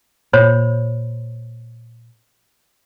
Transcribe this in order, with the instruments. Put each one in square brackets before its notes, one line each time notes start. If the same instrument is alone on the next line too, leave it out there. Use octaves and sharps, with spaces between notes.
[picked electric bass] A#2 [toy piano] C5 C#5 B5